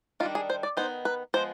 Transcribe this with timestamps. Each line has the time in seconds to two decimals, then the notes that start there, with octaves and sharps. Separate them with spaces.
0.20 D#3 F4
0.23 G3 D4
0.35 G#4
0.50 C5
0.63 D5
0.77 D#3 B3 D#4 C5
1.05 B4
1.34 F3 G#3 B3 C5